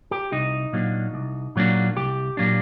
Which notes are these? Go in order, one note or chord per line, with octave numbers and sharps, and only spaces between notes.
G4
C2 D#4
A#2 F#3 A#3 D4
C2
A#2 F#3 A#3 D4
C2 G4
A#2 F#3 A#3 D4